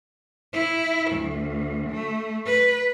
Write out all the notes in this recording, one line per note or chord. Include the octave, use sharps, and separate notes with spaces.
E4
D2
A3
B4